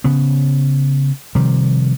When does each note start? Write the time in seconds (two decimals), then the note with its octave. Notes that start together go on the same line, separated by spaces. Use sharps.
0.04 C#3 B3
1.35 C3 D#3 F3 G3